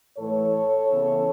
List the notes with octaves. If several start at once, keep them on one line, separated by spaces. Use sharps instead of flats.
A2 E3 A3 A4 C#5
C#3 E3 B3